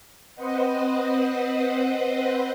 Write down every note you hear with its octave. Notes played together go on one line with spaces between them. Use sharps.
C4 B4 C5 D#5 F#5